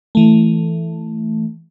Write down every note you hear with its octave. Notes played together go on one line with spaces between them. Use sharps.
E3 A3